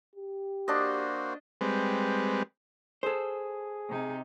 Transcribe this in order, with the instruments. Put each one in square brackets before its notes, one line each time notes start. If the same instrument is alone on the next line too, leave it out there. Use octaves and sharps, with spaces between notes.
[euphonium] G4
[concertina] A#3 F#4 C5 [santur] D4 D#5
[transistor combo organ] G3 G#3 C4 B4
[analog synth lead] G#4 [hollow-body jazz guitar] A4 C5
[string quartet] C3 D#4